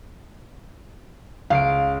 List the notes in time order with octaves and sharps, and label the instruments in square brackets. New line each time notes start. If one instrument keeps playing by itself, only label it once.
[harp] C#2 C7 D7 [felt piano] F5